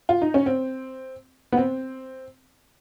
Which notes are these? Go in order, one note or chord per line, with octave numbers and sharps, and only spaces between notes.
F4
D#4
C#4
C4
B3
C4